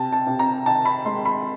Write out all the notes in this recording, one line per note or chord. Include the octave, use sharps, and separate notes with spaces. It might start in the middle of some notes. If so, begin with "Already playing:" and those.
Already playing: C3 A5
A5
C3
A#5
D#3 A5
B5
G#3 C6
B5